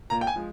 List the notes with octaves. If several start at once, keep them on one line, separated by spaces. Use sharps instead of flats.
A#2 A#5
G5
G#5
F3 G#3